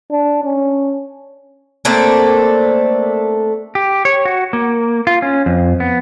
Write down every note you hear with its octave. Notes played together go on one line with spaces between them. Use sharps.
D4
C#4
A3 A#3 C4 D4
G4
C#5
F#4
A#3
F4
C#4
F2
B3